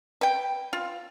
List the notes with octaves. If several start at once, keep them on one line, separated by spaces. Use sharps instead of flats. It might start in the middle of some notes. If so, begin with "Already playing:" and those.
B4 G5
F4